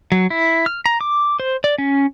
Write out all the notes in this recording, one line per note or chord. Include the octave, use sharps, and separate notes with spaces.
F#3
E4
F6
A#5
D6
C5
D5
C#4